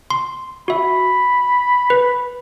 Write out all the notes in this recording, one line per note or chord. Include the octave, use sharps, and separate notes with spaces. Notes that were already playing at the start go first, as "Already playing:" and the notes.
C6
F#4 E5 B5
B4